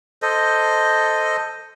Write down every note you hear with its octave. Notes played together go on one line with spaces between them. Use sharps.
A4 C5 D#5